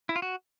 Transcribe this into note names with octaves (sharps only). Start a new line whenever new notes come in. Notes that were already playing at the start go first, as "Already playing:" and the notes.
E4
F4
F#4